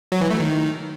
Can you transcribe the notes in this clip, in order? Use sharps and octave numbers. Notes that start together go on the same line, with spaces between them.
F#3
E3
A3
D#3